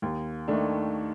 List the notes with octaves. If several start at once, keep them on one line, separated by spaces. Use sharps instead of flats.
D#2
D#3 A3 D4